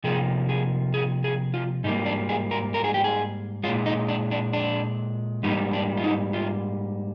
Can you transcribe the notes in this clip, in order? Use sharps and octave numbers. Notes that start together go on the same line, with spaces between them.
C3 F3 A#3 G#4
G#4
G#4
G#4
F4
G#2 G3 A#3 D#4
D4
G#4
A#4
A#4
G#4
G4
G#4
G#3 F4
A#2
D#4
D4
D4
D4
G#2 G3 A#3 D#4
D4
F4
D#4
F4